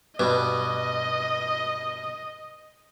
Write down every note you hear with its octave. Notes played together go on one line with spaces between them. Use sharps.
G2 B2 D#5